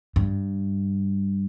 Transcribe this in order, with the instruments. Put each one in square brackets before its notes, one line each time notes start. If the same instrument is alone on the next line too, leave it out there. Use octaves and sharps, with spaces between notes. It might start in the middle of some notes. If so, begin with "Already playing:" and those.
[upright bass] G2